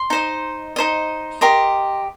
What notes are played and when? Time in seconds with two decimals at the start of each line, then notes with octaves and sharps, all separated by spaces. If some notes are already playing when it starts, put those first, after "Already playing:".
Already playing: C6
0.10 D#4 C5 D#5
0.76 D#4 C5 D#5
1.41 G4 A#4 D#5 C6